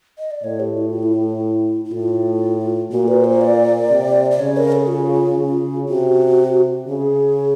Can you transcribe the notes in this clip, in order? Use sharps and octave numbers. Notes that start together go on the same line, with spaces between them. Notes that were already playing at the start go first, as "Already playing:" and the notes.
D#5
D5
A2 C#5
G4
E4
F4
E4
E4
A2 F4
A#2 F#4
B4
C5
D5
C3
D5
C#3 C#5
A#4
A4
F4
C#3
C3 F#4
C#3 G#4